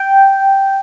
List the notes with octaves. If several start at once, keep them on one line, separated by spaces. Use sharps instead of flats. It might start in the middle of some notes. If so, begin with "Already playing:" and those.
Already playing: G5